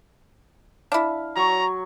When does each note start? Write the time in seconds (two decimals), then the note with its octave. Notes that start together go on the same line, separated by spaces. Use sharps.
0.92 D4 E4 F5
1.36 F#3 A#5 C#6